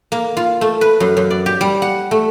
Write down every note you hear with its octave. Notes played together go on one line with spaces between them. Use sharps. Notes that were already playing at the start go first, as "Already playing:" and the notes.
A#3
F4
A3
B4
F#2
F#2
D5
G4
G3
F#5
A3